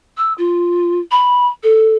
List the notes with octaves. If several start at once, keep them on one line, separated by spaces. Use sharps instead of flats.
E6
F4
B5
A4